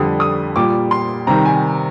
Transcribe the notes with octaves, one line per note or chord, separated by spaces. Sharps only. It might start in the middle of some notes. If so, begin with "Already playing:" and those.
Already playing: F2 D3 G3 D#6
D#6
A#2 G3 D6
C6
C3 D#3 G3 A#5
G#5